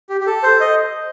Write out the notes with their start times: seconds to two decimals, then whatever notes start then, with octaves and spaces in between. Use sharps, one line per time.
0.10 G4
0.21 G4
0.27 A4
0.43 C5
0.60 D#5